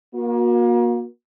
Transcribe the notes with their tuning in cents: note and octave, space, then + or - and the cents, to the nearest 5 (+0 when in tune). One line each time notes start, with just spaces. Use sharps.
A#3 +30 F#4 -35